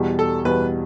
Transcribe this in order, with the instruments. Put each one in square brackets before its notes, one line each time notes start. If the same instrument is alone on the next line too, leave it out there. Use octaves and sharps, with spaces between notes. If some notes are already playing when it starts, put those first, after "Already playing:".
Already playing: [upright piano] E2 B2 G3
[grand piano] A4
[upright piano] E2 B2 G3 [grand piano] B4